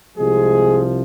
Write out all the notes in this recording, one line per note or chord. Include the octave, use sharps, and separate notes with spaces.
C2 C3 F3 G#3 G#4